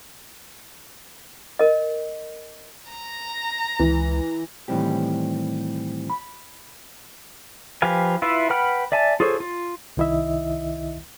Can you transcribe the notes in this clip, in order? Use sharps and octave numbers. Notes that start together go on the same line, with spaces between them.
A#4 D#5
A#5
C#2 E3
A2 D#3 E3 G3 C4 G4
B5
F3 G4 B4 F5 G#5
E4 F4 B4 E5
B4 F#5 G5 B5 F6
D5 E5 G#5 A5
F4 G#4 A4 C5 C#5
F4
C2 D#3 E4 D#5 E5